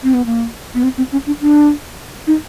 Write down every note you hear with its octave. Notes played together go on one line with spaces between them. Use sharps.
C4
B3
A#3
B3
C4
C4
C#4
D4
D4
D#4